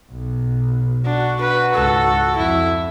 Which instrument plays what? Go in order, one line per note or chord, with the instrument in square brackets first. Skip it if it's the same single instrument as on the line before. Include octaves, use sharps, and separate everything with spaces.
[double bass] B1
[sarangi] D4 [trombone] F#4
[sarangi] B4
[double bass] C#2 G#2 [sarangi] A4
[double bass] F2 [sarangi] E4